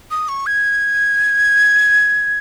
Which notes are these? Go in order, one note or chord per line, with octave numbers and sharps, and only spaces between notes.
D#6
C#6
G#6